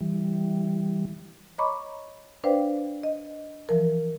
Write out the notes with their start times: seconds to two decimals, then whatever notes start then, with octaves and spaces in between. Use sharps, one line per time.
0.01 E3 G3
1.58 C#5 D#5 A#5 B5 C#6 D6
2.44 D4 B4 C5 D5 F5 G5
3.03 D#5
3.69 E3 F3 A#4